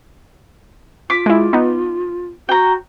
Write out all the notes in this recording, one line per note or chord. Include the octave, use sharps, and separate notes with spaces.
F4 D6 B6
G#3 E4
B3 D#4
F#4 G5 A#5